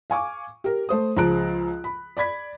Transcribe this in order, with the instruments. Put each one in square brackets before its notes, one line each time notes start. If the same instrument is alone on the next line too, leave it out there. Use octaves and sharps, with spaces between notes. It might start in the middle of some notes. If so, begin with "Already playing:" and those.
[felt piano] F5 G#5 C#6 D6
G4 A#4
A3 C5 D#6
C#2 F3 G#4 A#5 F#6 D7
B5
D5 B5 G#6 B6